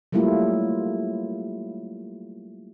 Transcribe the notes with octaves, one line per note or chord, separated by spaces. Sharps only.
F#3 G3 A3 A#3 E4 F4